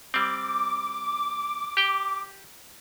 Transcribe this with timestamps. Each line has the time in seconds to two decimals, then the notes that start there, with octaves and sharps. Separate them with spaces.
0.14 G3 C4 D6
1.77 G4 G5